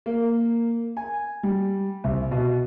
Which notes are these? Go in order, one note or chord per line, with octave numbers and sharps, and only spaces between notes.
A#3
G#5
G3
C2
B2